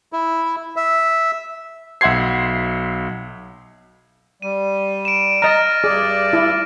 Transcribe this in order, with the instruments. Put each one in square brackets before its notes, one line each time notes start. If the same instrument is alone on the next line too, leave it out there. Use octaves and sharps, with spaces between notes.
[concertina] E4
E5
[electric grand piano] B1 E5 F#5 C6 G#6 C7
[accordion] G3 [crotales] D#7
[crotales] D7 E7
[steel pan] D#5 A#5 [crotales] F6 A6 A#6
[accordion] G2 D5 [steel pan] G#4
[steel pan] E4